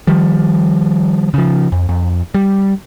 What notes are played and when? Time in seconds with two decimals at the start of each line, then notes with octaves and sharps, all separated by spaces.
0.07 D#3 F3 G3
1.34 C#3 F3
1.72 F2
1.89 F2
2.34 G3